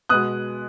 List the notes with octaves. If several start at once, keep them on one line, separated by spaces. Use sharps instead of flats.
B2 G#3 B3 D#6 F#6